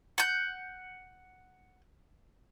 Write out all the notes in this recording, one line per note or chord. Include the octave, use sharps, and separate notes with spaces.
F#5 G6